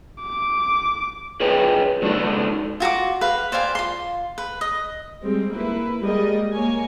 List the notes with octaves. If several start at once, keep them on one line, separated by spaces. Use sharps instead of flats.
D6
G#4 B4 C#5 D#5 G5
F#3 G#3 D4 D#4 F#4 A4
F4 F#4 A#5 D6
B4 F5
C5 D5 F5 G#5
F4 C6
B4
D#5
G3 G#3 C4
A#3 E4 B4
G3 G#3 A#3 G#4 D#5
A#3 C#5 G#5